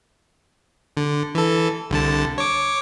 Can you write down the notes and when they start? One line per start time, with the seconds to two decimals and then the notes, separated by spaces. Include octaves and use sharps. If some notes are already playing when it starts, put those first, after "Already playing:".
0.97 D3
1.35 E3 A4
1.90 C2 D3 A5
2.38 C#5 D6